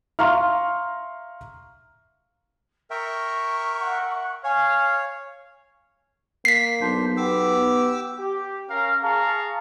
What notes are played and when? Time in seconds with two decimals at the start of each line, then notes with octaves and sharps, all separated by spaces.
0.19 E5 F5 A#5 C6 C#6 F6
2.91 A#4 E5 G5 C#6
3.81 F#5
4.44 C#5 F5 G#5
6.45 A#3 B6 C7
6.81 B1 D4 C5
7.17 B3 G4 D6 E6
8.19 G4
8.70 C#4 A#4 F5
9.03 G#4 F5 A5 A#5 C#6